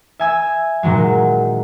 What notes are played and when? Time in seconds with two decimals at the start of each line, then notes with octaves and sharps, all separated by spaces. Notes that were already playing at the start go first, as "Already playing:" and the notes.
0.20 E5 G#5 E6
0.83 A#2 D#3 F#3 G#3